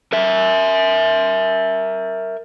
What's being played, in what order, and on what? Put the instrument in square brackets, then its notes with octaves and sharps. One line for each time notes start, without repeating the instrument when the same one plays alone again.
[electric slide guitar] A#4 E5